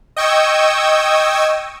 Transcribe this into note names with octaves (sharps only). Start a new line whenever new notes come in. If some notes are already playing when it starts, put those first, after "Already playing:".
D#5 G5 C#6 D#6 E6 G#6